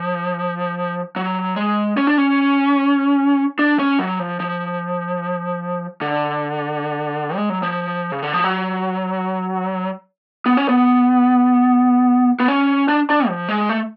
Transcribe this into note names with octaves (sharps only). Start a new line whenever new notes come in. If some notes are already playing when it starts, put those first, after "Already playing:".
Already playing: F3
F#3
G#3
C#4
D4
C#4
D4
C#4
F#3
F3
F3
D3
G#3
F#3
F3
C#3
D3
F3
F#3
B3
C#4
B3
B3
C#4
D4
D4
F3
G#3
A3